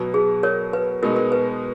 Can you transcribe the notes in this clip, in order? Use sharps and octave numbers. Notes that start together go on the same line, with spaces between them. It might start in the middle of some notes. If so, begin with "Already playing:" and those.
Already playing: B2 F#3 B3
G#4
A#4 C#5
B4
B2 G#3 B3 D#4 A#4
A#4
B4